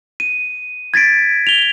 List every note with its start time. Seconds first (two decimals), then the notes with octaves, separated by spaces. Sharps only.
0.20 D#7
0.94 G#6 A6 B6 D7
1.47 F7 G7